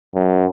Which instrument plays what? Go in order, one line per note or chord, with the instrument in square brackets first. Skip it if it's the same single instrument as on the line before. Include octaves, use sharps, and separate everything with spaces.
[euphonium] F#2